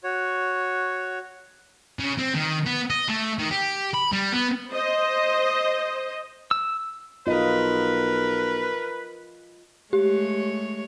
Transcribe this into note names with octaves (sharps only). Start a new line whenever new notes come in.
F#4 C#5
C#3
C4
D#3
B3
D#5
A3
D#3
G4
B5
G3
B3
C5 D#5
E6
B1 F4 A#4 B4 D#5
G#3 A3 G4 C#5